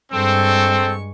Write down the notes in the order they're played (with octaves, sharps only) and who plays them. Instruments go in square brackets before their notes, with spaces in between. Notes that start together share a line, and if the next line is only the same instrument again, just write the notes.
[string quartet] G2 G#3 C#6 [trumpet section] C4 A4